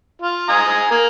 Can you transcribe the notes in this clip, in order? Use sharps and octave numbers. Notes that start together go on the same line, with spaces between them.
F4
G#5 A#5 D#6
A#3